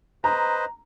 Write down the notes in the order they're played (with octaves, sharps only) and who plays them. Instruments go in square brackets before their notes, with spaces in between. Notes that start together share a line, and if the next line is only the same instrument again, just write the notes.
[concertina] B4 C5 D#5 [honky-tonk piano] A#5